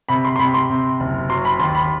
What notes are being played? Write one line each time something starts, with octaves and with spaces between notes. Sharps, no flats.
C3 B5
C6
C6
C3 B5
C6
C3
F#1
F#3 C6
B5
D#2 C6
B5